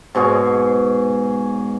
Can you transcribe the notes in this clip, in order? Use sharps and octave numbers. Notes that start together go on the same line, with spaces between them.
G#2 B2 G#4 C#5